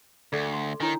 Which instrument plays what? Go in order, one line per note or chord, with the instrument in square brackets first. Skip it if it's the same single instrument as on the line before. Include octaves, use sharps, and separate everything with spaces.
[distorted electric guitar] D2 [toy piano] A4 D5 D6
[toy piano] C6
[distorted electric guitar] D#3 [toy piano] D4 E4 C#5